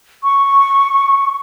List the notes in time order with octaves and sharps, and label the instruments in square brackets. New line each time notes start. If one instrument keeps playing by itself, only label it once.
[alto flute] C#6